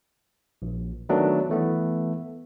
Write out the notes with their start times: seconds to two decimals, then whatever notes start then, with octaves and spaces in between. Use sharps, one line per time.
0.62 A#1
1.09 D#3 F#3 A3 B3 D4
1.50 E3 A3 B3